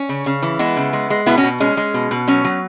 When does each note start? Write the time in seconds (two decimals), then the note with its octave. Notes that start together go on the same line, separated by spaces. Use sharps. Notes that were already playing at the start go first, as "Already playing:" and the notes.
Already playing: C#4
0.09 C#3
0.26 C#3
0.42 E3
0.59 G#3 B3 E4
0.76 C#3
0.93 G#3
1.10 G#3
1.26 B2 B3 E4
1.38 C#4 F#4
1.44 B2
1.60 G#3 C#4
1.77 G#3
1.94 B2
2.11 B2
2.27 F#3 C#4
2.44 F#3